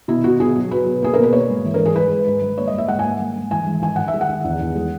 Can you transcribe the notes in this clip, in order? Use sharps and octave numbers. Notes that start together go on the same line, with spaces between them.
B2 E4
B2 F#4
B2 G#4
F#3
F#3 B4
B2
A#3 G#4
B2 A#4
B4
A#3 C#5
G#2
E3
A#4
G#2
G#4
G#2 B4
G#2
G#2
G#2
A#3 C#5
D#5
G#2 E5
G#2 F#5
G#5
A#3
G#2
G#2
E3 G#5
G#2
D#3 G#5
D#3 F#5
E5
G#3
F#5
D#3
E2
E2
G#3